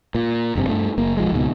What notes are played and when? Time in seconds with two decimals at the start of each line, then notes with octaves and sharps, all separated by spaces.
0.15 A#2
0.55 F1 G2 C3
0.69 G2 A3
0.98 F#1 A#3
1.17 B1 F3 G#3
1.31 C#2 G#2 B2